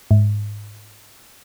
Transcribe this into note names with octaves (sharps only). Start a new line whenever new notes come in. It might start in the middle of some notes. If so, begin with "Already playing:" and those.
G#2